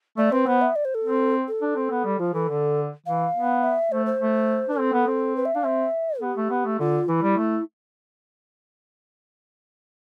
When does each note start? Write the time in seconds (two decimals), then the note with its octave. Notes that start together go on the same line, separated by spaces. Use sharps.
0.18 A3 D5
0.32 C4 B4
0.47 B3 C5
0.61 E5
0.76 D5
0.85 C5
0.95 A4
1.04 C4
1.48 A4
1.62 D4
1.76 C4
1.91 B3
2.05 G3
2.19 F3 F4
2.34 E3 A4
2.48 D3
3.06 E3 F5
3.34 B3
3.63 E5
3.92 A3 C5
4.06 C5
4.20 A3
4.69 D4
4.78 C4 A4
4.93 B3
5.07 C4
5.36 B4
5.45 E5
5.55 D4 F5
5.64 C4 E5
6.22 B3 G4
6.37 A3
6.50 B3
6.65 A3
6.79 D3 F4
7.08 E3 E4
7.23 G3
7.37 A3